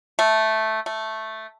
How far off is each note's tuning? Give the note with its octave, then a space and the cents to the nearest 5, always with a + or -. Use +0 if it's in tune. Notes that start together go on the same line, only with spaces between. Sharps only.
A3 -5
A3 +0